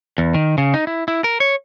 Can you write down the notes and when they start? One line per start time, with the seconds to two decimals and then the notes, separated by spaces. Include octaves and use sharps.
0.18 E2
0.34 D#3
0.58 C#3
0.74 D#4
0.87 E4
1.08 E4
1.24 A#4
1.40 C#5